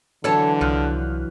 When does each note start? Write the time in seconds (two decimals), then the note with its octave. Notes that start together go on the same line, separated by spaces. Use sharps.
0.24 D3 E3 F#3 D4 A4 C#5 A5
0.61 C2 F3 F6 F#6